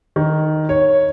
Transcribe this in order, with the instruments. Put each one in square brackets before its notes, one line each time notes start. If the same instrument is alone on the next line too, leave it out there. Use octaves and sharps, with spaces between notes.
[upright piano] D#3
C#5